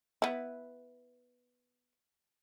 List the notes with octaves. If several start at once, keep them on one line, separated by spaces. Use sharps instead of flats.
B3 E4